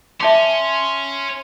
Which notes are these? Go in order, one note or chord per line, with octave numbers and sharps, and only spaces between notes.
C#4 E5 A5 C6 D6